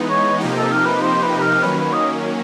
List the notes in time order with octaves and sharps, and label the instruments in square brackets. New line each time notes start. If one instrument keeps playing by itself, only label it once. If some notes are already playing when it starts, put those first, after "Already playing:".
Already playing: [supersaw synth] E3 G#3 B3 D#4
[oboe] C#5
[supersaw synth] C3 F3 A#3 D#4 G4
[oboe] A4
A#4
B4
C5
B4
B4
A#4
[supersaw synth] D#3 F#3 A#3 C#4 [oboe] B4
[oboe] B4
D#5